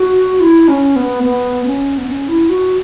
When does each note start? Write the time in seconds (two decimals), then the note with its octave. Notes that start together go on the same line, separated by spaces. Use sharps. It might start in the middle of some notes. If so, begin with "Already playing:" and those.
Already playing: F#4
0.40 E4
0.68 C#4
0.96 B3
1.24 B3
1.66 C#4
1.98 B3
2.08 C#4
2.28 E4
2.49 F#4